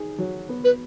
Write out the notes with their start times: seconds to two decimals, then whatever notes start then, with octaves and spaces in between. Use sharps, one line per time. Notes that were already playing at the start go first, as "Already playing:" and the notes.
Already playing: D#4 G#4
0.18 F#3
0.49 B3
0.64 B4